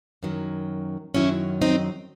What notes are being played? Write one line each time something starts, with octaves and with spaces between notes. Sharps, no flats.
F#2 D#3 F#3
F#2 D#3 F#3 C#4 E4
C4 D#4